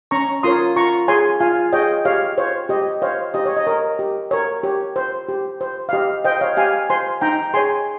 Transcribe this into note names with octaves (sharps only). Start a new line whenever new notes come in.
C#4 A#5 C#6
F4 A#4 C#5 C6 D#6
F4 A#5 C#6
G#4 C#5 G#5 C6
F4 F5 G#5
G#4 C#5 D#5 G5
G4 C#5 F5
C5 C#5
G4 D#5
C5 C#5 F5
G4 D#5
C#5
D#5
A#4 C#5
G4
A#4 C#5
G4 C#5
C5
G4
C5
F5
G4 D#5
C5 D#5 G5
C#5 F5
G4 F5 G#5
C5 G#5 C6
D#4 G5 A#5
G#4 C#5 G#5 C6